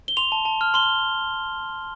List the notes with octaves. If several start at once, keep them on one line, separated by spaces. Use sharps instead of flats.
G7
C6 F7
A5
A5
F6
C6 G7